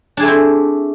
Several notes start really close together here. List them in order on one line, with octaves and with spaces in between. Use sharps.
D4 G#4 A3 E4 C4